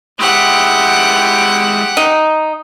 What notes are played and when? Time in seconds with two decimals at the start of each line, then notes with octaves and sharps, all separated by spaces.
0.20 G#3 E4 G4 F#5
1.97 D#4